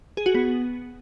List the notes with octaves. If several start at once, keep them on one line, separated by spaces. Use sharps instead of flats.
G#4
F#4
B3